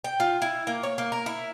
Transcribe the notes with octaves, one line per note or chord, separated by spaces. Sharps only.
G5
F4
E4
A#3
C#5
A#3
A#4
E4